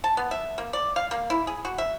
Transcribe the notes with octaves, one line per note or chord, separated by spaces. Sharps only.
A5
B3
E5
A#3
D5
F5
A#3
E4
G#4
F#4
E5